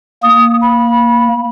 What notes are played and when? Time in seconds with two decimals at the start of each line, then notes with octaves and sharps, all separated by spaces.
0.23 A#3 D#6
0.61 B5